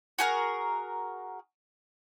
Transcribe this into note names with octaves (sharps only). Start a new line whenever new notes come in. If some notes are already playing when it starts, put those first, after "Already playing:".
F#4 G#4 A#4